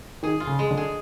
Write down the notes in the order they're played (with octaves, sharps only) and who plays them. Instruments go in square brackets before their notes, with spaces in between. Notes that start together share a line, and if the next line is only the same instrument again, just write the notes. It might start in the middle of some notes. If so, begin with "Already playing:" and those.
[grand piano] D#3 [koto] G#4
[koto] F4
[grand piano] C#3
[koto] G#3
[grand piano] D3
[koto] G#4